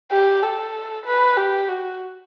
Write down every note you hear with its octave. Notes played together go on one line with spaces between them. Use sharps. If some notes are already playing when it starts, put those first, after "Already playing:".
G4
A4
B4
G4
F#4